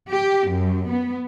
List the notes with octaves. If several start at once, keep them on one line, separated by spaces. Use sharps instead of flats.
G4
F#2
B3